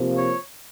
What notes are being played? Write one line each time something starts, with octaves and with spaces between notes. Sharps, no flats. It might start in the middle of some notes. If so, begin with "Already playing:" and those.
Already playing: C3 F3 A#3
C#5